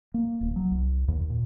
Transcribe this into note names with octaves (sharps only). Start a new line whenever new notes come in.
A#3
D1
F#3
C2
D#2
A#2